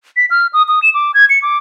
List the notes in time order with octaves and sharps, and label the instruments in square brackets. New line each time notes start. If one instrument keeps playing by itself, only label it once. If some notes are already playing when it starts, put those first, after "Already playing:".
[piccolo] B6
F6
D#6
D#6
E7
D6
G#6
C#7
D6